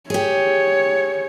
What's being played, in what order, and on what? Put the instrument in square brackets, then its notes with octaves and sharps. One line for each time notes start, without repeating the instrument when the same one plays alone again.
[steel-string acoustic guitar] G4 G#4 [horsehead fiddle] C#5